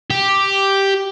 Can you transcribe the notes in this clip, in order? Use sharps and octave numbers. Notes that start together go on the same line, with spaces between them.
G4